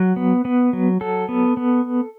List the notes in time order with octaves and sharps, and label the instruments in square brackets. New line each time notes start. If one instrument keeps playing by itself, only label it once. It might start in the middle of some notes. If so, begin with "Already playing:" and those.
Already playing: [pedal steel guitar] F#3 F#5
B3
B3
F#3
F#3 A4
B3
B3